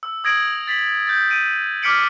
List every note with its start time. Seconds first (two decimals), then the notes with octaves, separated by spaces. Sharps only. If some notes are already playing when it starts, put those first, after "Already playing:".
0.03 E6
0.24 D#6 G#6 A#6 D7 F#7
0.68 A6 B6 F#7
1.07 G6 A6
1.30 D7 D#7
1.82 D6 F6 B6 C#7 D7 F#7